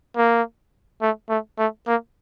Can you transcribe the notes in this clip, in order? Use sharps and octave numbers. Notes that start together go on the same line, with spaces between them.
A#3
A3
A3
A3
A#3